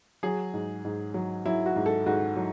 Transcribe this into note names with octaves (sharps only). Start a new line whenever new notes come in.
F#3 G#4
G#2
G#2
F#3
F#3 E4
F#4
G#2
A4
G#2 F#4
F#3